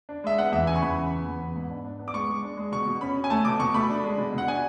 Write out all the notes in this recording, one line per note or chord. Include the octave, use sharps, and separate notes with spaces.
D4
G#3 E5
B3 F#5
E2 E5
C#3 G#5
C#6
E2 B5
C#3
B3
E2
B3
G#2
D4
D4
B3
D6
G#3 C#6
G#3
D4
G#3
B2 C#6
B2
C#4 B5
C#4
G#5
A3 A5
B2 D6
B2 C#6
A3 B5
D4
G#3
B2
B2
F#5
D4 G#5